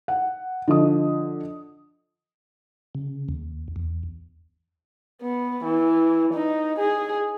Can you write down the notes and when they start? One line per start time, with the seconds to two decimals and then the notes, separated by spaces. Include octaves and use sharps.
0.08 F#5
0.68 D3 F3 D#5 D#6
2.95 C#3
3.29 D#2
3.76 E2
5.22 B3
5.65 E3
6.34 D#4
6.79 G#4